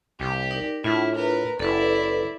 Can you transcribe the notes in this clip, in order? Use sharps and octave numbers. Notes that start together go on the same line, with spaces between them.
C2 G4
D#4 A#4 D5
A2 D4 E4 F4
A#4 B4
F#1 E4 A4 B4 D5